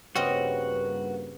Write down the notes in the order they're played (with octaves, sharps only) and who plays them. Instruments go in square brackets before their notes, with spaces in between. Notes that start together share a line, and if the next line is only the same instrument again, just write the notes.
[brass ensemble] G2 A#3 B4 [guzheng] C#3 C4 D#5 [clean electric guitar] F#4